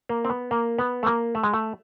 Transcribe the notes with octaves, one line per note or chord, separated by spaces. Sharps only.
A#3
C4
B3
A#3
B3
A3
A#3
A3
G#3
A3